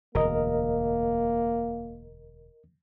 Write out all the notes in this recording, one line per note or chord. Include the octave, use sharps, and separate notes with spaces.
E1 D2 A#3 A#4 D#5